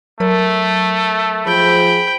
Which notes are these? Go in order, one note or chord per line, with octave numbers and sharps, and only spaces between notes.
F#3 A3 A#4
F3 G#4 C5 G5 B5